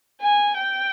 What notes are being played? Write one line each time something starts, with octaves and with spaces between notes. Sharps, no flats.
G#5
G5